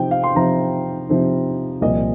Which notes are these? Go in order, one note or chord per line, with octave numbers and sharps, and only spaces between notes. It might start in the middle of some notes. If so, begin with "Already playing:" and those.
Already playing: C3 F3 C4 D#4 G5
F5
C6
C3 F3 C4 D#4 A#5
C3 F3 C4 D#4
C2 A#2 F3 D#5